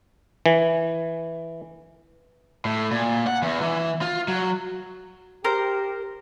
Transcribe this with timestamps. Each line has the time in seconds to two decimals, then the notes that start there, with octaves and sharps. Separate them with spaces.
0.46 E3
2.65 A2
2.91 A#2
3.27 F#5
3.42 E2
3.61 E3
4.02 F4
4.28 F#3
5.45 G4 A#4 C5